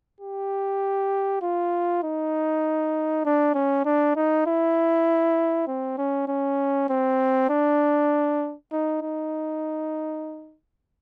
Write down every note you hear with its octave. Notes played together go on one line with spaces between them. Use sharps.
G4
F4
D#4
D4
C#4
D4
D#4
E4
C4
C#4
C#4
C4
D4
D#4
D#4